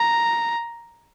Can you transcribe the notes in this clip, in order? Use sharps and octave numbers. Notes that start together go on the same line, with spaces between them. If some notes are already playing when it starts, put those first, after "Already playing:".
Already playing: A#5